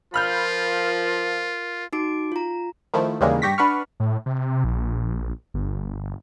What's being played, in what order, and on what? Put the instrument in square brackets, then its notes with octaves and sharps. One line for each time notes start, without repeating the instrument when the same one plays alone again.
[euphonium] F3 [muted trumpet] F4 [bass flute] A#4 [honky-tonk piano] B5 F6 G6
[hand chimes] D#4 F#4 D6 D7
F4 A#5
[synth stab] D#3 F3 A3 E4
D#2 C#3 E3 G3 G#3 A#3
G2 G4 C#6 A#6 B6
D4 B4 F#5 B5 C#6 F6
[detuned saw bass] A2
C3
A#1
G1